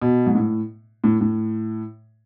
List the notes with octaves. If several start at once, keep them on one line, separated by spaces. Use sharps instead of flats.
B2
G#2
A2
A2
A2